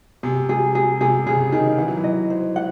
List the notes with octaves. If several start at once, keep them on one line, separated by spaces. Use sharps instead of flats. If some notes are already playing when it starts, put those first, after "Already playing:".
C3 G#4
G#4
G#4
C3 G#4
C#3 G#4
D#3 G#4
E3 F#5
F#3
E3
D#5
C5
F#5